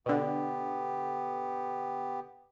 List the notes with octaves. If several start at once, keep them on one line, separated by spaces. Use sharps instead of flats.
B2 D3 B3 G4